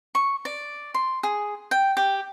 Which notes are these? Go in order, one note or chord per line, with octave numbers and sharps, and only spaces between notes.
C#6
D5
C6
G#4
G5
G4